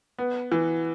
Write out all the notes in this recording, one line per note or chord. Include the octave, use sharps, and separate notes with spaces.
B3
E3